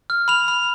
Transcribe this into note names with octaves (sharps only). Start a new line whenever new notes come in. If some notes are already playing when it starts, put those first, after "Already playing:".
F6
B5 F7
B5